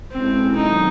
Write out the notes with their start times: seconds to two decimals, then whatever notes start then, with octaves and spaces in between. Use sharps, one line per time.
0.11 B2 G#3 C4 C#4 E4 A4
0.55 D#3 F#3 B3 D4 D#4 F4